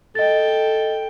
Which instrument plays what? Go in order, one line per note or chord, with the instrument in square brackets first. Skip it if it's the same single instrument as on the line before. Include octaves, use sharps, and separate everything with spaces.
[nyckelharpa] A4 G5 [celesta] D#5 A6